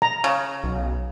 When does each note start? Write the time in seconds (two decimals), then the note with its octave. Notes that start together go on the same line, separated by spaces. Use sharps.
0.02 A#5
0.24 C#3
0.64 B1